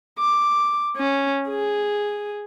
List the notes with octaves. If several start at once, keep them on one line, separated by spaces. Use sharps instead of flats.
D6
C#4
G#4